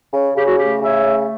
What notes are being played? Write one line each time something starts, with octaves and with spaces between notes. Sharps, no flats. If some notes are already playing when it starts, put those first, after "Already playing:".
C#3
C#3 G4
F#4
A3 G4
C#3 C#5 E5
A3